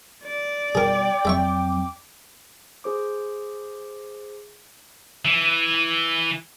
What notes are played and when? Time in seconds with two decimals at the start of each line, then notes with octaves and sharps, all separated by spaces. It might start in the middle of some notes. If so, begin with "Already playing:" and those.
0.24 D5
0.75 B2 G3 G#4 A#4 G5 D6
1.25 F2 F#3 G#3 C4 E5 C#6
2.84 G#4 C5 D6
5.25 E3